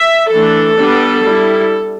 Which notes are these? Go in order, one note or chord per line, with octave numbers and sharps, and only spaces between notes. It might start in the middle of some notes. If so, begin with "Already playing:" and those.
Already playing: E5
E3 A3 D4 A4
G3 B3 D4
G3 E4